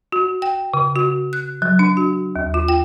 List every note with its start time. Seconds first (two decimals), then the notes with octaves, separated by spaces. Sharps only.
0.12 F#4
0.42 G5
0.74 C#3
0.96 F#4
1.33 F#6
1.62 F#3
1.79 D4
1.97 F#4
2.36 D#2
2.54 F4
2.68 G5